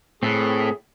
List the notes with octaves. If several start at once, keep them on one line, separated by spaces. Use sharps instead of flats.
A2 C4 G#4 A4 B4